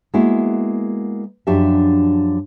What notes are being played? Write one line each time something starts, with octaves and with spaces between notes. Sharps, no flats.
G#3 A#3 B3 E4 F#4
F#2 F3 D4 F#4 G4 E5